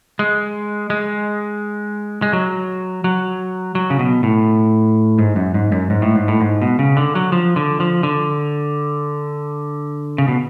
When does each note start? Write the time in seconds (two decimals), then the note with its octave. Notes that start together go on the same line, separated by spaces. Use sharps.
0.19 G#3
0.90 G#3
2.22 G#3
2.33 F#3
3.04 F#3
3.75 F#3
3.90 C#3
3.99 B2
4.23 A2
5.19 G#2
5.36 F#2
5.54 G#2
5.72 F#2
5.90 G#2
6.02 A2
6.15 G#2
6.28 A2
6.41 G#2
6.62 B2
6.79 C#3
6.97 D3
7.15 F#3
7.32 F3
7.56 D3
7.80 F3
8.03 D3
10.18 C#3
10.28 B2